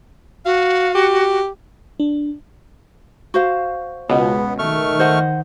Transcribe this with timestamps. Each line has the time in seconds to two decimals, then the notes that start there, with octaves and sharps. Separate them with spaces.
0.45 F#4 F5
0.95 G4
2.00 D4
3.34 F#4 C5 F5
4.09 C#2 B2 B3
4.59 D#3 A3 C#6 F6
4.99 C5 D#5 F#5